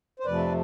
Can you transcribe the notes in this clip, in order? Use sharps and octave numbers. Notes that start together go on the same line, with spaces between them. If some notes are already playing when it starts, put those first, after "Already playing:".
C5
F2 C3 F3 A3 B4 D5